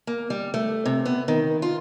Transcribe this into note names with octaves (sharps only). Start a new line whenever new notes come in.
A#3
G3
A3
C3
B3
D#3
F4